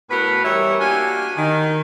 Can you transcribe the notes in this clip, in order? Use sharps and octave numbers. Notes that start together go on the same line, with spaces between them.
A2 B3 F#4 A#4 B4 B5
E3 G3 E4 G4 A#4 C#5
A#3 D4 F#4 G4 G#5
D#3